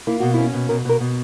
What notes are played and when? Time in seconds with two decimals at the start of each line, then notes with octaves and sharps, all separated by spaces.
0.07 A#3 E4
0.20 B2 F#4
0.34 C#4 E4
0.53 B2
0.69 B2 A#4
0.85 B2 A#4
1.00 B2